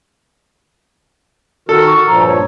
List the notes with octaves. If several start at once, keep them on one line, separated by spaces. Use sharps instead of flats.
D#3 F#4 A4 A#4
C#6
G2 A#2 F3 A#5
C#5